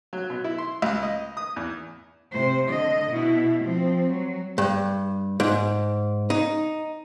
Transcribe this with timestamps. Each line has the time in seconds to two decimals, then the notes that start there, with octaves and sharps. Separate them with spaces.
0.13 F#3
0.30 B2
0.44 E4
0.58 C6
0.82 C#2
1.03 D#5
1.37 D#6
1.56 E2
2.32 C3 C5
2.69 D3 D#5
3.11 B2 E4
3.63 F3 C4
4.11 F#3
4.58 G2
5.40 G#2
6.30 D#4